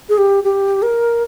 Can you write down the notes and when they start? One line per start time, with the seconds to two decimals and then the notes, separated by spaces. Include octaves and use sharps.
0.09 G#4
0.18 G4
0.44 G4
0.82 A#4